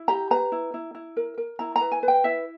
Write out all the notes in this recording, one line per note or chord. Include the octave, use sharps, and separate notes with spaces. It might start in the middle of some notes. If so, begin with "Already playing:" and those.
Already playing: E4
G4 A#5
B4 A#5
E4
E4
E4
A#4
A#4
E4 A#5
A#5
B4
G#5
B4
G5
E4 E5